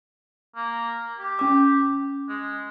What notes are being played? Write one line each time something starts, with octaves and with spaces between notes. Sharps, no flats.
A#3
G4
C#4 D6
G#3